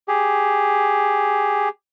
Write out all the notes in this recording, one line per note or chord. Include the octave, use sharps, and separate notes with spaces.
G4 G#4